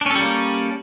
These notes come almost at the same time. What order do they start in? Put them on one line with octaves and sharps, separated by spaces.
D4 C#4 A4 G3 A#3